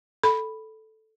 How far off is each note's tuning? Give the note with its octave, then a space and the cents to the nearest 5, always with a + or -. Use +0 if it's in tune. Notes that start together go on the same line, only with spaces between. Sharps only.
A4 +0 B5 +0